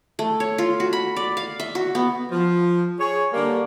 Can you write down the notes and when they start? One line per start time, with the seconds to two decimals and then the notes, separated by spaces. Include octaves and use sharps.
0.19 A3
0.40 C#5
0.58 F4
0.80 F#4
0.93 B5
1.16 D5
1.37 F5
1.60 E5
1.75 F#4
1.95 B3
2.31 F3
2.99 G#4 C#5
3.33 D3 G3 A#3